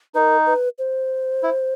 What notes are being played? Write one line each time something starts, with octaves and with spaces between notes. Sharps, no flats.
D#4 A#4 B4
B4
C5
E4